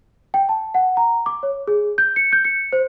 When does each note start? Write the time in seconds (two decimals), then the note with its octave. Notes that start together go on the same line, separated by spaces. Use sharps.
0.34 G5
0.49 A5
0.74 F#5
0.97 A#5
1.26 D6
1.43 C#5
1.68 G#4
1.98 G6
2.16 C#7
2.32 G6
2.45 C#7
2.73 C5